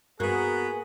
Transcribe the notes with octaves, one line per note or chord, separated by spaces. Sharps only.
G2 A#3 B3 F#4 G#4